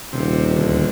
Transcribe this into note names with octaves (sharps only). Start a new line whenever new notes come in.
D#1 C3
D2